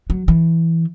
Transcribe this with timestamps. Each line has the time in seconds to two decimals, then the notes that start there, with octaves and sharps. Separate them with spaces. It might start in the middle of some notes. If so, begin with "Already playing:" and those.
0.10 F#3
0.28 E3